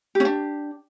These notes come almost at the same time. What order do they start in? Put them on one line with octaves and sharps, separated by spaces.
G4 C#4 D4